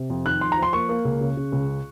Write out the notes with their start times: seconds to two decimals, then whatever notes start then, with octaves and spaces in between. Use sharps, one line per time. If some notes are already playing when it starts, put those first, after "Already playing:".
Already playing: C3
0.10 F2
0.26 D#3 F#6
0.41 F3 C6
0.52 A#5
0.57 F3
0.63 C6
0.73 A#3 C#6
0.89 A#3
1.05 C#2
1.21 C#3
1.37 C#3
1.52 C#2